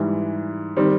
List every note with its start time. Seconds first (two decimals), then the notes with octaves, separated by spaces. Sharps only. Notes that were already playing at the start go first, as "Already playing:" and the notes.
Already playing: G#2 E3 G3
0.76 D#3 G3 C4